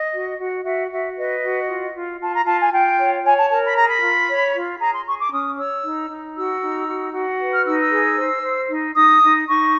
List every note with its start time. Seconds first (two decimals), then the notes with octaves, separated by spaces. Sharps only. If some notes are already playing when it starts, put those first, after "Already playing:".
Already playing: D#5
0.13 F#4
0.39 F#4
0.65 F#4 E5
0.91 F#4 E5
1.16 B4 D#5
1.43 F#4
1.68 F4
1.95 F4
2.20 F4 A5
2.34 A#5
2.46 F4 A5
2.59 G#5
2.73 F4 G5
2.99 C#5
3.24 C#5 G#5
3.37 A5
3.50 A#4 A5
3.64 B5
3.76 G#4 A#5
3.88 B5
4.02 F4
4.29 C#5
4.55 F4
4.80 G#4 A#5
4.93 C6
5.06 G#4 C#6
5.19 D6
5.32 C#4 D#6
5.58 C#5 E6
5.83 D#4
6.10 D#4
6.36 F#4 E6
6.62 D#4
6.88 F#4
7.13 F#4
7.40 B4
7.52 F6
7.65 D#4 E6
7.79 E6
7.91 G#4
8.17 C5
8.43 C5
8.69 D#4
8.95 D#4 D#6
9.21 D#4
9.47 D#4 C#6